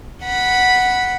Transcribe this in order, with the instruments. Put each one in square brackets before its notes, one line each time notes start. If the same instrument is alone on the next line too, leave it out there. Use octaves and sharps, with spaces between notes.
[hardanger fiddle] F#5 B5